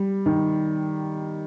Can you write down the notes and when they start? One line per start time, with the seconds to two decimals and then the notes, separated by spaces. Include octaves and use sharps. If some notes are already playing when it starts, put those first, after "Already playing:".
Already playing: G3
0.26 D#3